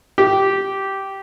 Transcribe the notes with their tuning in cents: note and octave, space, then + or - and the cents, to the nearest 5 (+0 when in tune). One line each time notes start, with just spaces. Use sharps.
G4 -10